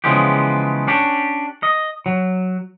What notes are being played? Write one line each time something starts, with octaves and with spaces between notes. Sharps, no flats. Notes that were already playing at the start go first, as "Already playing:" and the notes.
C#3 E3 F3 G#3 B3 G4
C#4 D4 G4
D#5
F#3